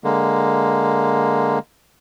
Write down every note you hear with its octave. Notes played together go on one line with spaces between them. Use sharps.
D3 G#3 A#3